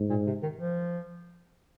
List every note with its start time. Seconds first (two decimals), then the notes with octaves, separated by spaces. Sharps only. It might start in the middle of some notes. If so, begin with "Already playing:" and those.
Already playing: G#2
0.10 A#2
0.27 C3
0.43 D#3
0.59 F3